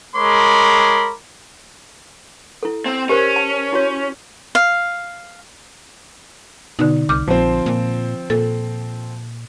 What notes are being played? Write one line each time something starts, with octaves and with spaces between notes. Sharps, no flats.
G#3 A#4 C#5 B5 C6 D6
E4 A4
C4
C#4 G4 A#4 C5
A5
E4 F#4 C#5
F5
B2 D3 D#4
C2 D6 F6 G6
A#1 F3 C4
A#2
A#2 A4